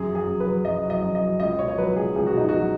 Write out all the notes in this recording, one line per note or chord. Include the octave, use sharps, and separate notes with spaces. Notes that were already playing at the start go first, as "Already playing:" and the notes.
Already playing: F#2 G#4
F#3
G#4
F#2
B4
F#3
F#2 D#5
F#3
D#5
F#2
D#5
F#3
C#2 D#5
B2 C#5
C#5
F#3 B4
C#2 G#4
C#2 G#4
F#4
B2 D#4
F#3 F#4